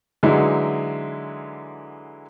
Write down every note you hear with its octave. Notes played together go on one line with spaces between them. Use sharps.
D3 E3 F#3 G#3 D#4 E4